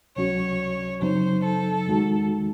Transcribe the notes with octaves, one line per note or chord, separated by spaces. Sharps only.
C#2 C3 F#3 C#4 F#4 C#5
F#2 C#3 F#3 C4 D#4 C5
A4
E2 D#3 G#3 D#4 F#4